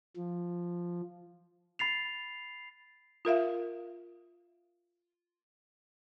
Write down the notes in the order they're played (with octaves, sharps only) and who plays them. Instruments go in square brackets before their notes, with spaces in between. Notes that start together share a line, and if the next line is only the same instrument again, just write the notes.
[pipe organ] F3
[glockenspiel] B5 A6 C7 F7
[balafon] F4 A#4 E5 F5